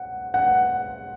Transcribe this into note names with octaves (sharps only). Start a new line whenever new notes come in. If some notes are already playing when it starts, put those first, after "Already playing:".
Already playing: F#5
F#5